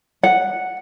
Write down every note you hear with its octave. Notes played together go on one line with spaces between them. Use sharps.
F#5